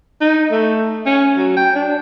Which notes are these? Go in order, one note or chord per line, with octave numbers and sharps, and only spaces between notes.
D#4
A3
C#4
F#3
G5
D4